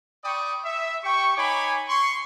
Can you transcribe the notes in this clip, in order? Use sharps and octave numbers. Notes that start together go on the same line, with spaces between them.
D5 G5 B5 C#6 D#6
E5
G4 G5 C#6
D#4 C#5 G#5 B5 D6
C6 C#6